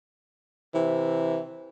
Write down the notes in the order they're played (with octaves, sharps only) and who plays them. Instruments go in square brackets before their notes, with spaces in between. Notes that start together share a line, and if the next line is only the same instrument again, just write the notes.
[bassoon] C3 [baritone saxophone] E3